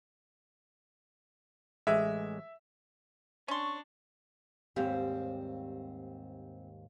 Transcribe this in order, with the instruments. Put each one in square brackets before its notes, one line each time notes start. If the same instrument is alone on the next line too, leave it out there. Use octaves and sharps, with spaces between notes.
[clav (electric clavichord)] A1 G#3 [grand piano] E5
[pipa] C#4 C6 [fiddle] D4 [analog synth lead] C#6
[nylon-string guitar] D#2 G#2 F5 [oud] G3 [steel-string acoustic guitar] C4